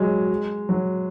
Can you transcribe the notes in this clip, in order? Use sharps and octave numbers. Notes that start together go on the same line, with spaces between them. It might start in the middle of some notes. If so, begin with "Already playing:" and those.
Already playing: F#3 G#3
F#3